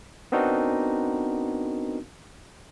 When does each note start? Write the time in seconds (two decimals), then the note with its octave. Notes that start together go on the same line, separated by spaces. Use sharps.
0.32 B3 C4 D4 D#4 F#4 A#4